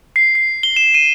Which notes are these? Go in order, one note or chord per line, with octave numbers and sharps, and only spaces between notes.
C7
C7
G7
E7
D#7